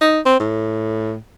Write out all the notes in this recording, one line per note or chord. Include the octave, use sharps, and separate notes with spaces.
D#4
C4
A2